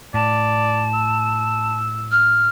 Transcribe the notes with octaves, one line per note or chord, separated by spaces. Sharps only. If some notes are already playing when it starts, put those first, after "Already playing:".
A2 D5 A5
E6
F6